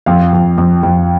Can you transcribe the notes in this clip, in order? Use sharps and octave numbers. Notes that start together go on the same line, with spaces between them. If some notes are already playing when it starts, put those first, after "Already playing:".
F2 F5
F2
F2
F2